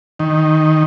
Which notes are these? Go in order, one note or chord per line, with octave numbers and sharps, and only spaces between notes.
D#3